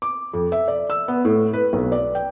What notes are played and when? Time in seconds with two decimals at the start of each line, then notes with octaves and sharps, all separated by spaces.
0.02 D6
0.33 F2
0.52 E5
0.68 D5
0.90 E6
1.08 B3
1.25 A2
1.53 B4
1.73 B1
1.92 D5
2.15 G5